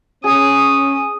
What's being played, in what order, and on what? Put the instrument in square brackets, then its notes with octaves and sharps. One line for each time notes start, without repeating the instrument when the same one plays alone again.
[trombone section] C#4 [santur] G#4 [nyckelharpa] D#6